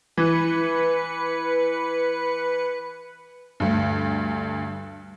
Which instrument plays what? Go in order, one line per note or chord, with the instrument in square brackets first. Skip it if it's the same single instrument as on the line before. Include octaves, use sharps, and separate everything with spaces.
[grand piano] E3 [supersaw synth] B4 C#7
[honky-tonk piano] D2 G2